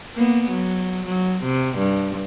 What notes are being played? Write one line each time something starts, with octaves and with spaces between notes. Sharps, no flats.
A#3 B3
F#3
F#3
C3
G2